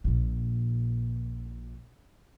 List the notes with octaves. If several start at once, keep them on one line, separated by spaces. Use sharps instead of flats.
A#1 A#2